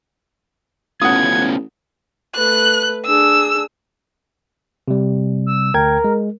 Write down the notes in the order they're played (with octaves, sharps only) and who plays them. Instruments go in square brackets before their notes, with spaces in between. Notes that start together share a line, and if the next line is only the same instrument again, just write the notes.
[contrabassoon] A1 [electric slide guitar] B3 C#4 F4 [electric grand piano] F#5 D#6 [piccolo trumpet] G#6
[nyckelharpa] A3 B4 [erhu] F#6
[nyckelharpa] D4 G#4 [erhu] E6
[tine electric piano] C3 G3
[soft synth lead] E6
[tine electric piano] D2 G5 G#6 [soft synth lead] A#4
[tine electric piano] G#3